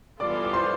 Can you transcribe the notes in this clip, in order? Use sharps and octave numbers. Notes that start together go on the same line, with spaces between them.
E3 G3 B3 F4 A4 D5 D6
D6
C5 C6